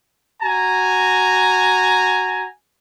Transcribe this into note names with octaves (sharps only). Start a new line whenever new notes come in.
F#4 G#5 A#5